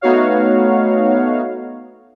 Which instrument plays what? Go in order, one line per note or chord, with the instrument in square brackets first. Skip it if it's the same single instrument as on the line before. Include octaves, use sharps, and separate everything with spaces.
[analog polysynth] A3 B3 D#4 F#4 C#5 F5